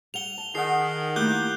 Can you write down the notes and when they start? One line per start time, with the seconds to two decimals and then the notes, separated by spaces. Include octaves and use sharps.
0.14 G3 F#5 F7 G7
0.38 A5
0.55 D#3 G#4 F#5 C7
1.16 A3 A#3 E4 G4 F#6 G6 G7